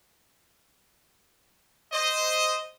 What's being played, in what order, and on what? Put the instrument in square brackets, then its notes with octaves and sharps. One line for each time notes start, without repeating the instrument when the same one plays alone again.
[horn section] C5 D#5